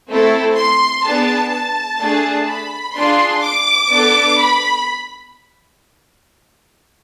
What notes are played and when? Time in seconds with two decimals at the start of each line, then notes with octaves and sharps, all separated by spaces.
0.09 A3 C4 E4 A4
0.56 C6
1.04 B3 D4 G#4 A5
1.52 A5
1.99 A3 D4 G#4
2.47 B5
2.94 D4 F4 G#4 C6
3.43 D6
3.91 B3 D4 A4
4.39 B5